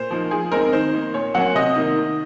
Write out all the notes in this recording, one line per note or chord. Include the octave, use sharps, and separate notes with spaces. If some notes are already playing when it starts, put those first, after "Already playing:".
Already playing: A#2 C5
F3 A#3 D#4
F3 G#4
G#3 C4 D#4 A#4
D#3 C5
A#3 D#4
A#2 C#5
F#3 A#3 C#4 F#5
C3 D#5
D#3 A#3 D#4
D#3